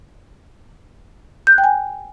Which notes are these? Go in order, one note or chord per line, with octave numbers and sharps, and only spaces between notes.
G6
F#6
G5
G#5